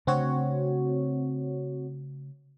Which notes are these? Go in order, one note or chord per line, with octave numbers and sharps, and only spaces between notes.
C#3 A3 C4 D4 F#4 C#5